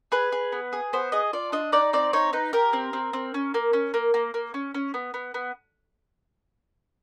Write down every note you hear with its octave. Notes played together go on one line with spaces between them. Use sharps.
G#4 B4
G#4
B3
G#4
B3 C5
G#4 D#5
F4 D5
D4 D#5
D#4 D5
C4 D5
D#4 C#5
D#4 B4
G4 A#4
C4
C4
C4
C#4
A#3
C#4
A#3
A#3
A#3
C#4
C#4
B3
B3
B3